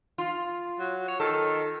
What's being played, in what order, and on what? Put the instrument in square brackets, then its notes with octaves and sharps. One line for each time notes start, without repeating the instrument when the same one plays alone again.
[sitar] F4
[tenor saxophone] F#3
C#5
[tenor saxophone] D#3 [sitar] A4